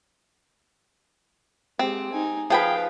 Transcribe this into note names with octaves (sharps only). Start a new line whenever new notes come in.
G#3 C4 G4
D#4 G#5
F3 G#4 B4 F5 G5 B5